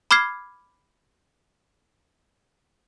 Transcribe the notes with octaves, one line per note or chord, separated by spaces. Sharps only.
B5 D6 F6 G#6 C7